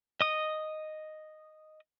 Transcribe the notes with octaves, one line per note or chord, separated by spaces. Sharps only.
D#5 D#6